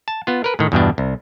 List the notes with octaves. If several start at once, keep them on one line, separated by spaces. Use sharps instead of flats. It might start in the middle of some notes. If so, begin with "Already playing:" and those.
A5
B3 F4
A#4 B4
A2 D#3
E2 G2 B2 D4
C2